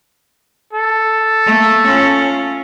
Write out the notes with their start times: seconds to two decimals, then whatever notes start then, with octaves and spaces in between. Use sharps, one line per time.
0.73 A4
1.46 A3 A#3
1.87 C#4 F4